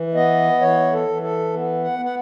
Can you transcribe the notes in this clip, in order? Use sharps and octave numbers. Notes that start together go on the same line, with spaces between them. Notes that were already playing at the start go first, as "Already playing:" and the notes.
Already playing: E3
B3 D#5
E3 C#5
A4
E3
A4
B3
F#5
B3
F#5